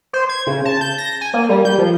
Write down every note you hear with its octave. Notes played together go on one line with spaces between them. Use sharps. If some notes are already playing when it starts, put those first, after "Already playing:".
C5
G#6
C#3
A5
G6
A#6
G#5
A#3
G3
G6
F3